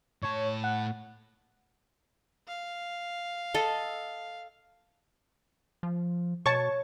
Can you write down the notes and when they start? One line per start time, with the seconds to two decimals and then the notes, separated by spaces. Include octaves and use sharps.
0.23 A2 C#5 A5
0.64 F#5
2.47 F5
3.54 A4 D#5
5.83 F3
6.46 B2 C#5 A5 C#6